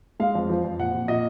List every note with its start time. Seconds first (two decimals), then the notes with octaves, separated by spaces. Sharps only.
0.20 G#3 F5
0.35 F2
0.49 F3
0.64 F2
0.79 A#2 F#5
0.94 A#2
1.08 A#2 D#5